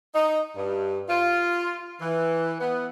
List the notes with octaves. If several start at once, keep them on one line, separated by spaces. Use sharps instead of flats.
D#4
G2
F4
E3
B3